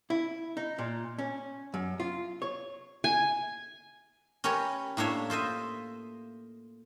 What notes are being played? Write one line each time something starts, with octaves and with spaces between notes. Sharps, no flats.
E4
D#4
A#2
C#4
F#2
F4
C#5
G#5
C#4 G4 A#4 B4 C#5
A2 A#3 D4 C#5 E5
F4 C5 D#5 E5